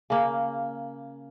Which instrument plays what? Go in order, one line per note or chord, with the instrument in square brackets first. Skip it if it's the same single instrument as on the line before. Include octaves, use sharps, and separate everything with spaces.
[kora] C#3 A#3